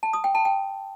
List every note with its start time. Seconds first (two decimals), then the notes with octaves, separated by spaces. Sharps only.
0.03 A5
0.13 D#6
0.24 G5
0.35 A5
0.45 G5